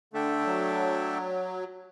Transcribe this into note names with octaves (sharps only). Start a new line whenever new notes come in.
D3 A3 D4 A4 E5 G5
F#3